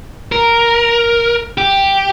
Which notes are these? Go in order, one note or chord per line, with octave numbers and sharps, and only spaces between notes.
A#4
G4